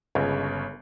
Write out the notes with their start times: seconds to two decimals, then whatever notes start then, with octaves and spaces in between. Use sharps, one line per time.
0.15 G1 C#2 C#3 C#5